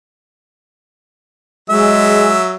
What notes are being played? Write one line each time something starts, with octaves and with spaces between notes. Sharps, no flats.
F#3 G#3 E5